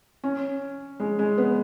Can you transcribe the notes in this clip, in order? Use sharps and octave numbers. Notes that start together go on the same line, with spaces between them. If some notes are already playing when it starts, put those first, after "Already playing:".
C#4
G#3
G#3
B3